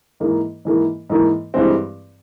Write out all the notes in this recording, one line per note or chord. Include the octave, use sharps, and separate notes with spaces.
G#2 E3 A#3
G#2 E3 A#3
G#2 E3 A#3
G2 E3 G#3 C4